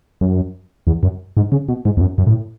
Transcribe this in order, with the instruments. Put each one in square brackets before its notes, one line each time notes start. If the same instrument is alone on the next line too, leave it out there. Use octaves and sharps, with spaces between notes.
[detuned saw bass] F#2
E2
F#2
G#2
C#3
B2
G#2
E2
F#2
F#2
A2